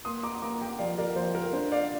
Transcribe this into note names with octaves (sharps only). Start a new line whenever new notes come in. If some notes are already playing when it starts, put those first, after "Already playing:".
A#3 C6 D#6
A#5 D6
A#3 A#5 D6
G5 A#5
F3 D5 F5
A#4 D5
F3 C5
A#4
D4 C5
D5 F5